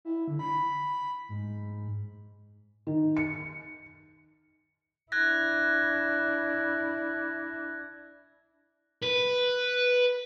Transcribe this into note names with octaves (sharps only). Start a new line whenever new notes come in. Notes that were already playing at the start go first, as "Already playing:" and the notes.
E4
D3
B5
G#2
D#3
C#7
D4 E4 F#6 G#6 A#6
B4